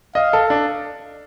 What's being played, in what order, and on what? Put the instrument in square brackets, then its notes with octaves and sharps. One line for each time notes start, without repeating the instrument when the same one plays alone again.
[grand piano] D#5 [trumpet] F5
[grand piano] A4
D4